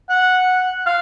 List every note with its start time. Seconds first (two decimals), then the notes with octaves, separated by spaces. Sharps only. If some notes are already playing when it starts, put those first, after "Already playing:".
0.10 F#5
0.86 F5